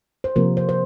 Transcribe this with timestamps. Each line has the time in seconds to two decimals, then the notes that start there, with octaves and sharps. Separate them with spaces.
0.24 C5
0.36 C3 F3 A#3 A#4
0.57 C5
0.69 C5